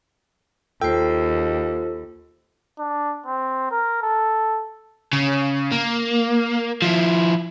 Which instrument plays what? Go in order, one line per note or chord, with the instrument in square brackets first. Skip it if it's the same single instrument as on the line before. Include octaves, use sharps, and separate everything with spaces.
[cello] D#2 [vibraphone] F4 C5 [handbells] A4 [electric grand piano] G5
[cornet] D4
C4
A#4
A4
[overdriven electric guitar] C#3
A#3
F3 E4